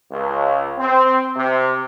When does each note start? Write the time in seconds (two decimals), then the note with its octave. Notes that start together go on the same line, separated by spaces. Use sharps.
0.11 C#2
0.78 C4
1.36 C3